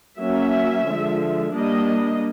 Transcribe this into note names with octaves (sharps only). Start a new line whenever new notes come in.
F#3 A#3 C#4 E5
D3 F3 G#3
G3 A#3 D4 D#5